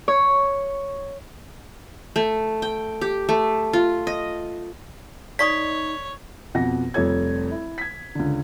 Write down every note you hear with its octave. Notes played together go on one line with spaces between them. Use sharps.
C#5
A3
G5
G4
A3
F4
D#5
D#4 C#5 D5 C#6 D#6 B6
F2 B2 F#5 A#6
F1 F2 G3 A4 C#5 G#6
E4
G#6 B6
C#2 D3